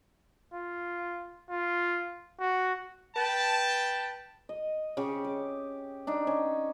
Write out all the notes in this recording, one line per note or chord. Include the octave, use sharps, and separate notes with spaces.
F4
F4
F#4
B4 G5 A5
D#5
C#3 G4
D6
D4 D#4
C#4